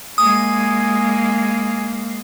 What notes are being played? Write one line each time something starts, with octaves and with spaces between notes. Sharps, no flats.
G#3 A#3 G#5 D#6